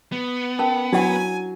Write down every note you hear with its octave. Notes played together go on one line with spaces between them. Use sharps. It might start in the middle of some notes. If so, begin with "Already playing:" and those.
B3
C#4 A#4 A5
F#3 D4 E4 F#5 G#5